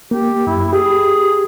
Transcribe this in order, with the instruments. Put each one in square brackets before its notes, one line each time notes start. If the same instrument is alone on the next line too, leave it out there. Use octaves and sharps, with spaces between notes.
[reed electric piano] A#3 [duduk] G4
[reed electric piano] F#2 [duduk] E4
[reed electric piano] G4 [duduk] G#4